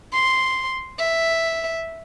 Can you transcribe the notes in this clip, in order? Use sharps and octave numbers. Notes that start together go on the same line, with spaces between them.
C6
E5